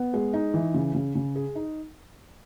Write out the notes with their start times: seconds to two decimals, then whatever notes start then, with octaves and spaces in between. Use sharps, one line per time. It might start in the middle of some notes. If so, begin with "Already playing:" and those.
Already playing: B3
0.14 G#3
0.33 D#4
0.54 E3
0.74 C#3
0.94 C#3
1.15 C#3
1.35 G#4
1.55 D#4